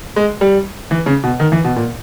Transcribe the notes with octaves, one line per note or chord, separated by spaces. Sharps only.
G#3
G3
E3
C#3
B2
D#3
E3
B2
A#2